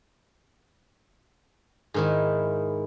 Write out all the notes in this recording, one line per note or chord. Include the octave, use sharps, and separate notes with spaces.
G#2 D#3 E4